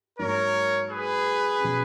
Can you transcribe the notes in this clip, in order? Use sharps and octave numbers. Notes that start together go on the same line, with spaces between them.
G#2 F#3 A#3 A#4 C#5
G#4 B4
B2 F#3 C#4